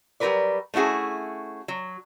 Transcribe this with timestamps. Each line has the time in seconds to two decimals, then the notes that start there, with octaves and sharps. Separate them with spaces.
0.20 F#3 G3 F#4 A#4 B4 D5
0.74 A3 C#4 E4 F#4 G#4
1.68 F#3